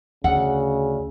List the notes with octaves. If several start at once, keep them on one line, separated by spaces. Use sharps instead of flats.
D2 C#3 F#5